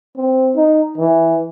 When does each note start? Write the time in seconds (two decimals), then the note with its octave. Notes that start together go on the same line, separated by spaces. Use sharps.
0.17 C4
0.56 D#4
0.98 E3